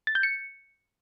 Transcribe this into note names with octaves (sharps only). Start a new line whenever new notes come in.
A6
G6
C#7